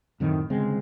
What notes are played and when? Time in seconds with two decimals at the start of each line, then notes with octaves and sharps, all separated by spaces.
0.20 F#2 A2 D#3 C4
0.50 G1 C#3 G#3 C4